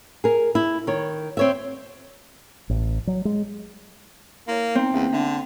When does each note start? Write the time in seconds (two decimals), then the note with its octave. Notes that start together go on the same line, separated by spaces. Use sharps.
0.24 G#4 A#4
0.55 E4
0.87 D#3 C#5
1.37 C4 C#5 E5
2.70 A1
3.07 F#3
3.25 G#3
4.48 A#3 E4 C#5
4.75 B3 C4 D#4
4.94 E2 A#3 C#4
5.13 D3 D4 E5